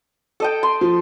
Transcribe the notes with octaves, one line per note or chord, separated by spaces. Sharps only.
A4 D#5 G5
C6
F3